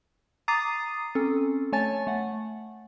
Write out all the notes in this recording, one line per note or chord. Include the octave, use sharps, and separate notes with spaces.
A#5 D6 D#6 A6 C7 D#7
C4 C#4 A4
A3 C#5 G#5 A5 A6
A3 F#5